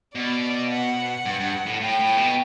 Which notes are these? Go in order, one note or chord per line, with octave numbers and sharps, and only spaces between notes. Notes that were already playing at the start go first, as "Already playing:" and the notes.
B2 D5
F#5
G2
G2
A2
A2 G5
A2
B2